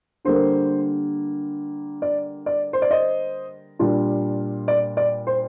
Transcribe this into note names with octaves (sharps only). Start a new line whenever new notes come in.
D3 G3 A#3 C5
D5
D5
C5
D5
C5 D#5
A#2 G3 D4 F4
D5
D5
C5